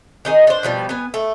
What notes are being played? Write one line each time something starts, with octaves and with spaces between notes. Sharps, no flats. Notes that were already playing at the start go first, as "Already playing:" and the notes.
D#3 D#4 G#4
D4 C5
B2 F3 G3
B3 G#5
A3